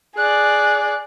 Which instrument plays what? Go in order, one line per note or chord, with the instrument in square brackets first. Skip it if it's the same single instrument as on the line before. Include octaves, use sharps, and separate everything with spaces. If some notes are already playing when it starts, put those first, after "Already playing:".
[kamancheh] G#4 D5 [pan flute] F#6